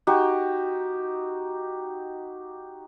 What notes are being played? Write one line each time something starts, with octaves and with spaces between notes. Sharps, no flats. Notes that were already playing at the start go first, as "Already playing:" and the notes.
D#4 F#4 G4